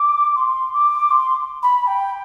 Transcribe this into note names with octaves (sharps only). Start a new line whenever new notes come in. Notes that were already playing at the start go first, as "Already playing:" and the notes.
Already playing: D6
C6
D6
C6
B5
G5